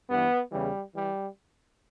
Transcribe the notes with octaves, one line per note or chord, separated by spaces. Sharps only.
G2 E3 B3
E2 C#3 E3 G3
E3 G3